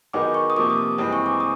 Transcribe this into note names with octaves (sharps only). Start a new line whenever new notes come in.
D#3 F#3 B3 D#4 G#4 D6
C#6
D#6
C3 F3 A#3 D6
D#6
G2 E3 G#3 C4 D#6
C#6
D6
D#6